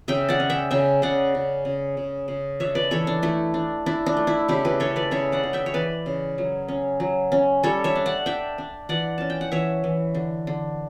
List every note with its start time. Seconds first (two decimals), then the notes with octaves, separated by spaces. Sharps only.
0.08 C#3 E5 G5
0.29 D5 F#5
0.40 C#4
0.50 E5 G5
0.71 C#3 E5 G5
1.02 C#3 D5 F#5
1.35 C#3
1.65 C#3
1.97 C#3
2.28 C#3
2.60 D4 C#5 E5
2.75 B4 D5
2.91 E3 A4 C#5
3.07 D4
3.23 A3 E4
3.54 D4
3.86 D4 E4
4.06 D4
4.17 A3
4.27 E4
4.48 C#3 E4 G4
4.65 G4 B4
4.80 C#3 A4 C#5
4.96 B4 D5
5.11 C#3 C#5 E5
5.32 D5 F#5
5.43 C#3
5.53 E5 G5
5.66 C#5
5.74 E3 B4 D5
6.06 C#3
6.38 F#3
6.68 C#4
7.00 F#3
7.32 C#4
7.63 G3 A4 C#5
7.84 C#5 E5
7.95 D4
8.06 D5 F#5
8.26 D4 E5 G5
8.58 D4
8.89 E3 D5 F#5
9.18 C#4 A5
9.30 G5
9.41 F#5
9.52 E3 C#5 E5
9.84 E3
10.15 D3
10.47 D3